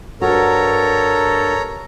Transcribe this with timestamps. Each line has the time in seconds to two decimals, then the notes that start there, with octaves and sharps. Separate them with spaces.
0.22 G2 F#4 A4 A#4 C#5 A#5